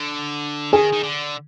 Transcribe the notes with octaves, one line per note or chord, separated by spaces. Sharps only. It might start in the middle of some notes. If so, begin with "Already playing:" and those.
Already playing: D3
D#3 G#4
D#3
D3